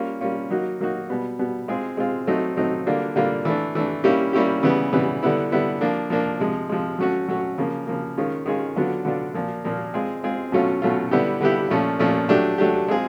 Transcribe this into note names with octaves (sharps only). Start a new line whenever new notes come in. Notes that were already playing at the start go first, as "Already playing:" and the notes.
Already playing: G3 A#3 C#4 F4
G3 A#3 C#4 F4
F#3 A#3 D#4 F#4
F#3 A#3 D#4 F#4
B2 G3 B3
B2 G3 B3
G#3 C4 F4 G#4
G#3 C4 F4 G#4
F#3 A3 C4 D#4
F#3 A3 C4 D#4
D3 G3 A#3 D4 F4
D3 G3 A#3 D4 F4
E3 A3 D4
E3 A3 D4
G3 A#3 C#4 E4 G4
G3 A#3 C#4 E4 G4
C#3 E3 G3 B3
C#3 E3 G3 B3
D3 G3 B3 E4
D3 G3 B3 E4
F3 A#3 D4
F3 A#3 D4
C3 F3 G#3
C3 F3 G#3
F#3 A3 C#4 F#4
F#3 A3 C#4 F#4
C#3 F3 A#3
C#3 F3 A#3
D#3 G#3 C#4 F4 G#4
D#3 G#3 C#4 F4 G#4
D3 F#3 B3 D4 F4
D3 F#3 B3 D4 F4
A#2 F3 A#3
A#2 F3 A#3
G#3 C4 F4 G#4
G#3 C4 F4 G#4
B2 F#3 A3 C#4 F4
B2 F#3 A3 C#4 F4
D3 G3 B3 E4 G4
D3 G3 B3 E4 G4
A#2 F3 A3 C#4
A#2 F3 A3 C#4
F#3 A3 D4 G4
F#3 A3 D4 G4
G#3 C4 F4 G#4